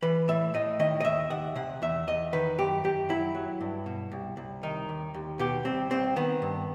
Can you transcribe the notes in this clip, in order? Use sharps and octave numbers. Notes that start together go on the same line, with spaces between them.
E3 B4
A2 E5
A2 D#5
D#3 D#5
D#5
D#2 E5
D#2 F#5
C3 F#5
E2 E5
E2 D#5
D#3 B4
F#2 G4
F#2 G4
F#3 E4
F#3
G2
B2
C2
C2
D#3 D#4
D#2
D#2
B2 G4
C2 C4
C2 C4
D#3 B3
G2